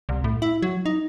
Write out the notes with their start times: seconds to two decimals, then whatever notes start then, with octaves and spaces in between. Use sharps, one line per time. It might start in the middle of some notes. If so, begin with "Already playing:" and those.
0.09 C2
0.24 A2
0.42 E4
0.62 F#3
0.86 D#4